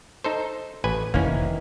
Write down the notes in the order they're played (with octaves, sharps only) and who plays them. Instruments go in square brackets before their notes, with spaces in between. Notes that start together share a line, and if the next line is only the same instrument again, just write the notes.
[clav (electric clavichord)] D#4 A4 C5
A1 B4 G#5
[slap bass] F1 [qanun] D#3 E3 [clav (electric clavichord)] A#3 C#4